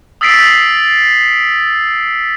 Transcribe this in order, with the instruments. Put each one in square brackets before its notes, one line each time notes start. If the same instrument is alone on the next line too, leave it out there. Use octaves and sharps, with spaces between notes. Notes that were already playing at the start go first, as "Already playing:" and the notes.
[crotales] D#6 E6 A6 B6 C7 D7